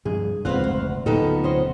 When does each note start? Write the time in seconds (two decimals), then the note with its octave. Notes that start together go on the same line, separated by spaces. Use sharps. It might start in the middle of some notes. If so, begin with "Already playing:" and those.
0.05 G2 C3 F3 G#4
0.45 F1 C#2 G#2 C4 F4 B4 F5 F#5
0.64 D2
1.06 D1 B2 B3 D#4 F4 G4 A4 D#5
1.44 C#4 C5 D#5